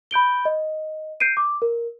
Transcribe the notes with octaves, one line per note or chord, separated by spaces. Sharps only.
B5 G6 D7 G7
D#5
G6 C7 D7 D#7
D6
A#4